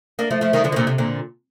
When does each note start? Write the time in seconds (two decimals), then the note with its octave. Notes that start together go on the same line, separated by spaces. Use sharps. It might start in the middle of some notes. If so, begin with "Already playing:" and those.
0.19 A#3 D4
0.31 F3 A3
0.41 F3 A3
0.53 D#3 G3
0.64 D3 F3
0.72 D#3
0.76 A#2 D3
0.87 C3
0.98 A#2 D3